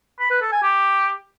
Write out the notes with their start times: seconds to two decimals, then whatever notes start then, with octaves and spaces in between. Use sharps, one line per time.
0.20 B5
0.30 B4
0.41 A4
0.52 G#5
0.63 G4